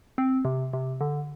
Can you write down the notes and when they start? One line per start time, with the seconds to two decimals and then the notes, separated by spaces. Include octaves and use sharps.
0.18 C4
0.45 C3
0.73 C3
1.01 D3